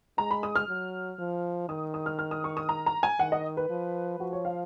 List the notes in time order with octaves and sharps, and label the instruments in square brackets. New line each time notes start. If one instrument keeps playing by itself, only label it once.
[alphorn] G#3 [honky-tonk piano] A#5
[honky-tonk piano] B5
D#6
F6
[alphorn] F#3
F3
[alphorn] D#3 [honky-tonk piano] D#6
[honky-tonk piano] D#6
F6
F6
D#6
C#6
D#6
A#5
A#5
G#5
[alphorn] D#3 [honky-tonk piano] F#5
[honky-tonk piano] D#5
B4
[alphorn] F3
[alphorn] F3 [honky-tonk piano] F#4
[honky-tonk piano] C#5
F5